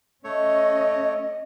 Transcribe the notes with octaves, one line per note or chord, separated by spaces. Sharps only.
A3 C#4 C#5 D#5